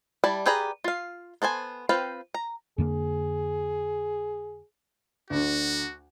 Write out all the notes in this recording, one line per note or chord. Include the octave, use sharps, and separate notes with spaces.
G3 E4 D5 A5
G4 G#4 B4 D5 A#5
F4 F5
B3 A4 C5 G#5
C4 F4 B4 F5 G5
A#5
F2 D3 A#3 G#4
D2 D3 F#4